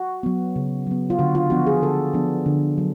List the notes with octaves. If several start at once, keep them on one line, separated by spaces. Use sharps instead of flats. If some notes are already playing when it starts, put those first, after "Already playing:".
Already playing: F#4
F#3 B3
C#3
F#3 B3
F4
D3 F#4
F4
F3 B3 D4 F#4
G#4
D3 A4
F3 B3 D4
D3
F#3